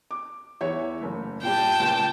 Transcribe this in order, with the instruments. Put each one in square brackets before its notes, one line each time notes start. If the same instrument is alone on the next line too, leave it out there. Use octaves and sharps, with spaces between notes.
[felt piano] D6
E2 C#5 E5
F#1 A3
[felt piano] A#2 G3 [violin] G5 A5
[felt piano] C#2 A#2